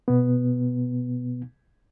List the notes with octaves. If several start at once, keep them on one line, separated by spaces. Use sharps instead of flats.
B2 B3